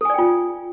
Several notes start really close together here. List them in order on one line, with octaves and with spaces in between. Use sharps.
A4 G#5 D5 G5 F4